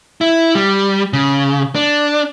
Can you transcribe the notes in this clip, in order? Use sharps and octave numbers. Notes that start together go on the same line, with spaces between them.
E4
G3
C#3
D4